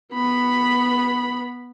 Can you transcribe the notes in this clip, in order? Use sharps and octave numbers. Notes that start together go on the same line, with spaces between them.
B3 B5